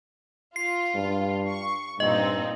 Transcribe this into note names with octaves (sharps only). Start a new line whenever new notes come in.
F4 C7
G2
C#6
G2 A#2 C4 D#4 D#5